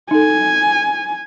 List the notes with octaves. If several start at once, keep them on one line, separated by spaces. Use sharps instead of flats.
D#4 A4 G#5